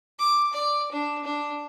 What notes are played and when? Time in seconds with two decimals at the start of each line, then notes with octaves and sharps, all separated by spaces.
0.19 D6
0.53 D5
0.91 D4
1.24 D4